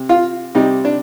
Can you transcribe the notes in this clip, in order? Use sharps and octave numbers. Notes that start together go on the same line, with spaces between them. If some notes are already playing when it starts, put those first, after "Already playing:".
Already playing: C3
F4
C3 G3 D#4
D4